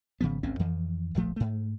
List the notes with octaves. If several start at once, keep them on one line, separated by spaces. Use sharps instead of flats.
G#1 C#3 F3 B3
G#1 D2 C4 C#4
F2 E3 F3
D1 A#1 F3 A3
G#2 A3